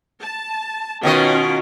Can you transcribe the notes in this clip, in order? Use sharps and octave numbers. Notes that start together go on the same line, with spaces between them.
A5
B2 D#3 C#4 F4 D#5